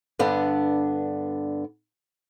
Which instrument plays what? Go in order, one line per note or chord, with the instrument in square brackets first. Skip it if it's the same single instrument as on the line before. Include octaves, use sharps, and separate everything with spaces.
[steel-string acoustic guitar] G2 D3 B3 D4